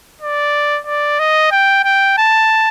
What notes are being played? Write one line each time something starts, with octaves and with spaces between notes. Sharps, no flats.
D5
D5
D#5
G5
G5
A5